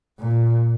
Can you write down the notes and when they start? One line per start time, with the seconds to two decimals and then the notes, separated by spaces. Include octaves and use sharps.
0.20 A#2